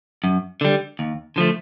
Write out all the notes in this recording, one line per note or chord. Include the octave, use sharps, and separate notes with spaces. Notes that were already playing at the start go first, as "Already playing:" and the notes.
F#2
D3 G3
D#2
D3 F3 A3